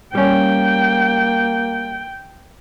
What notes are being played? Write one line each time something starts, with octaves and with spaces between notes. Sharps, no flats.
G3 A#3 C#4 G5